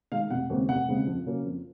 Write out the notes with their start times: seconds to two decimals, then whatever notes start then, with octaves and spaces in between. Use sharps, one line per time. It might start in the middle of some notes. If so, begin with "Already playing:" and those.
0.12 D#3 G#3 F5
0.30 F1 F#5
0.50 D#2 C#3 G#3 C4
0.69 F1 F#5
0.88 D#2 C#3 G#3 C4
1.07 F2
1.25 C#3 F#3 A#3 C#4
1.45 F2